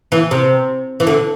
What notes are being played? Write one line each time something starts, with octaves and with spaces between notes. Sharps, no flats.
E3
C3
E3
D3